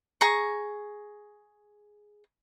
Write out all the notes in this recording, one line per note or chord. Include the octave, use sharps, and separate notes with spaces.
G#4 A#5 C#6